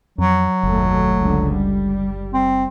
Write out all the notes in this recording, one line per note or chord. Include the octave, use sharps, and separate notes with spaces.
F2 F#3
F#1 D#2 B2 A3
C#2 D3
G3
C4